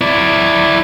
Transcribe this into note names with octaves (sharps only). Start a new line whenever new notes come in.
E4 D5